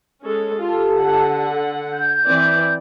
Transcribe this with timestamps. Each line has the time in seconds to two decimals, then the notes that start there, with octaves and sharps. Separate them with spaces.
0.24 G#3 C#4 A4
0.60 F4 G4 A4 A5
0.94 D3 F#5
1.95 G6
2.26 E3 C4 D5